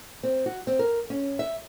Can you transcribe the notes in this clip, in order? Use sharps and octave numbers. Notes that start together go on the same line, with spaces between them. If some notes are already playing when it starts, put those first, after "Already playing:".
C4
F#4
C4
A#4
C#4
E5